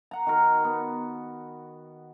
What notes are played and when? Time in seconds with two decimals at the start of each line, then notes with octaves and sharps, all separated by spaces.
0.11 F#5 A#5
0.27 D#3 F#4 A#4
0.64 B3